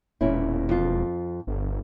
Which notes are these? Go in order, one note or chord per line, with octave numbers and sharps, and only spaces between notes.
E1 A#2 C#4 E4
F2 F4
G1